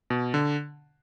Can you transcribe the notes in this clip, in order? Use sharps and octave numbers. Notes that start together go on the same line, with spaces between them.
B2
D3